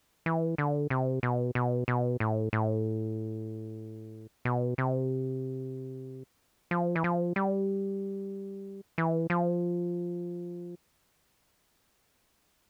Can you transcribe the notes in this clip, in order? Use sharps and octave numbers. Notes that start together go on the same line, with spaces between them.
E3
D3
C3
B2
B2
B2
A2
A2
B2
C3
F3
E3
F3
G3
E3
F3